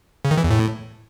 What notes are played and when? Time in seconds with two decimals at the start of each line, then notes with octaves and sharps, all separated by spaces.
0.25 C#3
0.31 D#3
0.37 E3
0.44 E2
0.50 A2